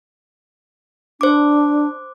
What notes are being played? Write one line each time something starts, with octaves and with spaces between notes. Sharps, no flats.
D4 C5 D6